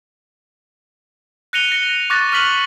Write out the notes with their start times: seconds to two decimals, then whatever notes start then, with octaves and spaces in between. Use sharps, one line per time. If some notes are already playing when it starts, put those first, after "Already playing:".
1.53 F#6 A#6 C#7 D#7 F7 G7
1.72 A#6 C#7 G7
2.10 C#6 D6 F#6 A6 A#6
2.32 C#6 F6 A6 B6 F#7